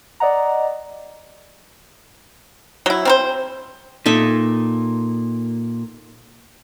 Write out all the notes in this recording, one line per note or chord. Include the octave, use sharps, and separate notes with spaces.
D5 D#5 F#5 A#5
F#3 E4
C4 A#4 C5
A#2 D#4 A4 E5